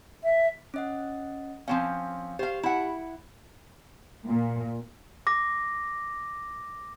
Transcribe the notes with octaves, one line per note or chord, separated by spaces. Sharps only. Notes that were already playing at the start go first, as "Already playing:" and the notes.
E5
C#4 D#5 F#5
F3 C4 C#4 F5
G4 C5 F5
E4 F#5
A#2
D6 A#6